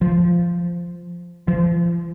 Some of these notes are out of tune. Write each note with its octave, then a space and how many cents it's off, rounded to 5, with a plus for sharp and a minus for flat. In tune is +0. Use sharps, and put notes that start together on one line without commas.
F3 -10
F3 -35